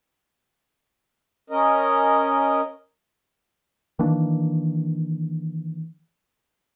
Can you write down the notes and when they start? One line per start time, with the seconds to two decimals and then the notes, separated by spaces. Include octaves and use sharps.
1.50 C#4 A#4 D#5
3.99 D#3 E3 A#3 D4